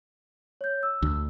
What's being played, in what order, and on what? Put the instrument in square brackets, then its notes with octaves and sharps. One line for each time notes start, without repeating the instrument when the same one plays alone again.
[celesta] C#5 G6
E6
[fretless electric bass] D2